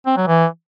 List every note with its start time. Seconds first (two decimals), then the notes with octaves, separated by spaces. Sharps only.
0.06 C4
0.17 F#3
0.27 E3